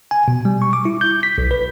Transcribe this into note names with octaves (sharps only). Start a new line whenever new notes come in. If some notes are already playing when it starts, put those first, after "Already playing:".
G#5
B2
G3
C#6
D6
E4
G6
B6
B1
B4